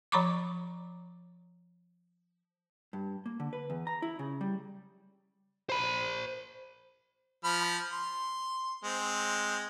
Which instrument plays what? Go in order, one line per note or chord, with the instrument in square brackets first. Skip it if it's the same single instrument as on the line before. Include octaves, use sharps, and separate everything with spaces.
[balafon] F3 C#5 A#5 B5 C#6 D6
[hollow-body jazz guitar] G2
A#3
D3
B4
E2
A#5
E4
C#3
G3
[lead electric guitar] C5 B5
[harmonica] F3 B5 F6
C6
G#3 C4